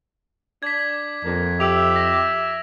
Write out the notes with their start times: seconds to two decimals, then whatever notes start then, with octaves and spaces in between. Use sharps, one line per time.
0.63 D4 G#6 B6
1.25 F2 A#3
1.60 G4 E5 E6 D7 F7
1.96 A#6